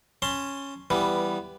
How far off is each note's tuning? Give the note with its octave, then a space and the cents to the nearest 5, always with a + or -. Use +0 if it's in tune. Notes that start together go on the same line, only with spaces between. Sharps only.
C#4 -5 A5 +20 C6 +0
E3 +10 G3 +0 B3 +0